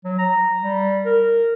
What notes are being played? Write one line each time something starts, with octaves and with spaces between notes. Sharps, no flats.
F#3
A#5
G3
A#4